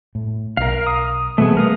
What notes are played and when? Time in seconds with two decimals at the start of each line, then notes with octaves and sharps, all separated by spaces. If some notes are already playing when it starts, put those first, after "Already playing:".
0.15 A2
0.57 B1 A#4 F5
0.87 D#6
1.38 B2 E3 G3 A3 B3 G#4
1.57 G3 A#4 F5 D#6